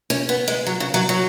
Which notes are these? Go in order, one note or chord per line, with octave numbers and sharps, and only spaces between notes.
C#4
B3
G#3
F#3
C#3
F#3
F#3